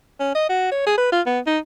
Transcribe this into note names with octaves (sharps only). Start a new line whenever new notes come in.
C#4
D#5
F#4
C#5
G#4
B4
F4
B3
D#4